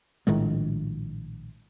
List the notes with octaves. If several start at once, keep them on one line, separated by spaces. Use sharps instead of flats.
A#1 A2 D#3 G#3